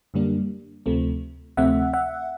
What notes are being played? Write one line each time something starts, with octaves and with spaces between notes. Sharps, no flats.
F#2 D3 G3 A#3 D4
D2 C3 F3 A3 C4
D2 C3 F3 A3 C4 E5 F#5
E5 F#5